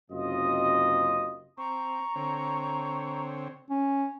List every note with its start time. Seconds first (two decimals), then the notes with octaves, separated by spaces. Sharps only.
0.11 F#1 F#2 C3 F4 D#5
1.58 C4 A#5 C#6
2.16 D3 C4 C#5
3.70 C#4